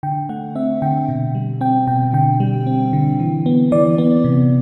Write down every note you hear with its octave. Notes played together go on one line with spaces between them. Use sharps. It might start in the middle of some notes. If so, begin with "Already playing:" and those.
D3 G5
A3 F#5
C4 E5
D3 G5
B2
G3
C4 G5
B2 G5
D3 G5
G3
C4
D3
E3
B3
E3 D5
B3
C3